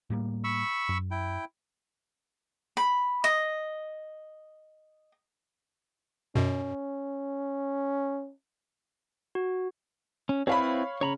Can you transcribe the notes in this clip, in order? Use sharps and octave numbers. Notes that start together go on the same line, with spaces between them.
A2 G3 A#3
B5 C#6 E6
F#2
E4 G5
B5
D#5
F#2 B2 C#4
F#4
C#4
C4 E4 B4 C#5 F5 B5
C#3 C#5 A#5 B5